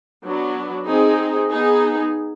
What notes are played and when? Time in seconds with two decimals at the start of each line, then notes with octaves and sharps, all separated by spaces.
0.23 F#3 B3 D4
0.86 C4 D#4 G#4
1.48 B3 D#4 G#4